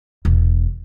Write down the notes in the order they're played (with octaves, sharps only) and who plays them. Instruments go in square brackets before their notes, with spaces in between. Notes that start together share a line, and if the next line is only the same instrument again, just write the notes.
[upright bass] E1